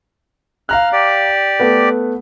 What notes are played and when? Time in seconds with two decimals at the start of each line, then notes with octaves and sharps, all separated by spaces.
0.69 F5 A#5 F6 F#6
0.92 G4 D5
1.60 A3 B3 B4